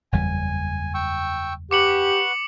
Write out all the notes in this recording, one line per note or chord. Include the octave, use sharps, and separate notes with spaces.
F#1 E2 G3 G#5
G5 C#6 E6
G4 B4 F#5 C#6 D6 C#7 F#7